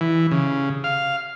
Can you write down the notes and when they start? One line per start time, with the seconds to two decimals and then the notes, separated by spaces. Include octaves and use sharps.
0.01 E3
0.31 C#3
0.84 F5